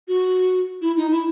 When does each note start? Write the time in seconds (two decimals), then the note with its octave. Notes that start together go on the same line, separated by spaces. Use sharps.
0.08 F#4
0.82 E4
0.97 D#4
1.11 E4